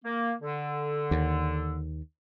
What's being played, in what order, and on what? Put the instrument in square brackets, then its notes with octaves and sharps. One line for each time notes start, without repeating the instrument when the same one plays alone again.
[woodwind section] A#3
D3
[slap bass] D#2